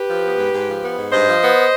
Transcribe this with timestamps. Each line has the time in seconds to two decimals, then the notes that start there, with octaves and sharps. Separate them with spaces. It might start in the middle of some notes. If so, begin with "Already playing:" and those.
Already playing: G4 B4
0.09 F3
0.24 B3
0.38 G#2
0.52 G#2
0.67 F3
0.83 B3
0.97 G#2
1.12 G2 C5 D#5
1.27 F3
1.41 B3